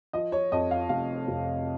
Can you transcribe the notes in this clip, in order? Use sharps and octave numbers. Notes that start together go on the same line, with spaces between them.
F3 D#5
C#5
F2 D#5
F5
F1 F5
F1